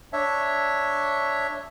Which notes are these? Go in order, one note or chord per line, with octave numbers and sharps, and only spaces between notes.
D4 C#5 E5